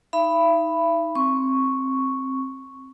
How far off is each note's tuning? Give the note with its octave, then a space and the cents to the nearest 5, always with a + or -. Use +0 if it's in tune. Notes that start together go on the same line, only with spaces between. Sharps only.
D#4 +25 E5 +40 B5 +0
C4 +10 C#6 +0